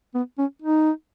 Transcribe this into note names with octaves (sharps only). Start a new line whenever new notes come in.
B3
C#4
D#4